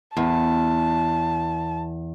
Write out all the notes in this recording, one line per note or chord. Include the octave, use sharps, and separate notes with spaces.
E2 A5